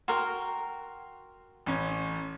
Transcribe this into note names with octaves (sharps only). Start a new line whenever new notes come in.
F#4 A#4 G5 C6
A1 C#4